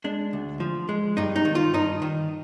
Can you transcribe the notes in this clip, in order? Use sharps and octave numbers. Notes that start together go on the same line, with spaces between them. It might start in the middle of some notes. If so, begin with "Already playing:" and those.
G#3 D4
D2
F3
G#3
G2 D#4
D#4
D#3
F4
G2 D#4
D#3